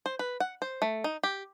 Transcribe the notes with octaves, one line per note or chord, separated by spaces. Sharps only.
C5
B4
F#5
C5
A3
D#4
G4